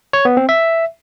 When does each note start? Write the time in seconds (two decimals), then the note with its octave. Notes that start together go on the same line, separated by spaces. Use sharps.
0.13 C#5
0.25 B3
0.37 C4
0.49 E5